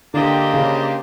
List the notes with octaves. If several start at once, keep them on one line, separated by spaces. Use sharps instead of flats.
D3 A#3 D4 G4 C5 D#5
C#3